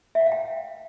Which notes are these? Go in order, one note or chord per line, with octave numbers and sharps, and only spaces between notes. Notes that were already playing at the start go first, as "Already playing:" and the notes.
E5
F#5
F5
G5